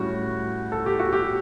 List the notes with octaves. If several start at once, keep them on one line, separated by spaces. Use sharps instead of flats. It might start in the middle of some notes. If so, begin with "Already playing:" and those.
Already playing: A2 G3 C#4 F#4
A4
G4
F#4
G4